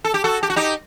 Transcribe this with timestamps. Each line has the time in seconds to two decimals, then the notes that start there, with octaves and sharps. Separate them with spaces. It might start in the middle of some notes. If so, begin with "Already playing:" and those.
0.04 A4
0.14 G4
0.24 F#4 A4
0.43 G4
0.50 F#4
0.56 D#4 G4